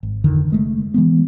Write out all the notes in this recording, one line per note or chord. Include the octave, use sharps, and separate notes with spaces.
G#1
F2 D3 D#3 F3
F#1 G#3 A3
E3 G#3 B3